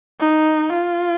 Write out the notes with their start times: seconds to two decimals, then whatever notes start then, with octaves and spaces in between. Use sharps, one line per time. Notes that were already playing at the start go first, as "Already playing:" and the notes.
0.21 D#4
0.74 F4